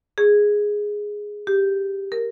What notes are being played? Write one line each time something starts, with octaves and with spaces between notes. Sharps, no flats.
G#4
G4
A#4